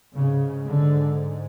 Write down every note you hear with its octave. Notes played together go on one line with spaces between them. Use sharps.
G#2 C#3
D3